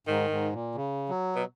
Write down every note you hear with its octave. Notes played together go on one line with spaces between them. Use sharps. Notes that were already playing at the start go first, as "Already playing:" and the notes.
G#2 D#3
G#2
A#2
C#3
F#3
B2